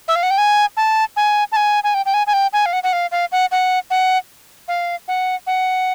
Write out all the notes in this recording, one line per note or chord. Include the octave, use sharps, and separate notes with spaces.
E5
F5
F#5
G5
G#5
A5
G#5
A5
G#5
G#5
G5
G5
G#5
G#5
G5
G#5
F5
F#5
F#5
F5
F5
F#5
F#5
F#5
F5
F#5
F#5